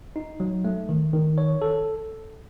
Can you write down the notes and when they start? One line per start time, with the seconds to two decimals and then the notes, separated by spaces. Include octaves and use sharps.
0.16 D#4
0.40 F#3
0.65 A3
0.89 D#3
1.13 D#3
1.38 C#5
1.62 A4